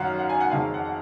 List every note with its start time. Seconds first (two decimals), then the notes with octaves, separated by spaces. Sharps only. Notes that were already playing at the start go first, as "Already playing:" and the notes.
Already playing: F#2 D#3 F#3 F5 F#5
0.19 F#5
0.29 G#5
0.40 F#5
0.51 F2 D#3 G#3 F5
0.74 F#5
0.85 F#5